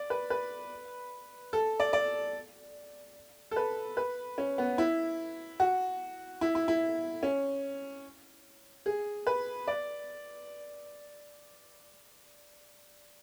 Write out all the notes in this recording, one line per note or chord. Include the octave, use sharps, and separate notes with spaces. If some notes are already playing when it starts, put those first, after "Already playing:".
Already playing: D5
B4
B4
A4
D5
D5
A4
B4
B4
C#4
B3
E4
F#4
E4
E4
E4
C#4
G#4
B4
D5